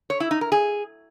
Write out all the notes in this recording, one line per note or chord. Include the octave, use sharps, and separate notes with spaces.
C#5
E4
D#4
A#4
G#4